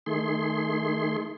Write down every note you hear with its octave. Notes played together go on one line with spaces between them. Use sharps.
D#3 A3 G#4 C6